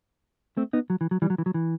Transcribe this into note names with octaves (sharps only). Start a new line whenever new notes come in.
A3 C4
B3 D#4
F#3
E3
F#3
E3 G3
F#3
E3
F#3
E3